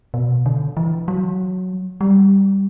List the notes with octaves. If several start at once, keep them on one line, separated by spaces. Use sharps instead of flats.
B2
D3
E3
F#3
G3